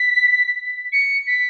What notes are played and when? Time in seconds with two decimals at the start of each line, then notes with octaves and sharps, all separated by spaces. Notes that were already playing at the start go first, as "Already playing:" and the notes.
Already playing: B6
0.92 C#7
1.27 B6